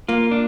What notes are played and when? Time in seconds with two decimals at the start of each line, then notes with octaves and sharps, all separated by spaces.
0.08 A#3 F4
0.31 D4